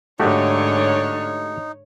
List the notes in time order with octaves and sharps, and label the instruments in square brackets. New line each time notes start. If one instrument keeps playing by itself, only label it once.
[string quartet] G#2 D3 [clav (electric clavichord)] A3 F#4 G4 [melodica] D#4 [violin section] C#5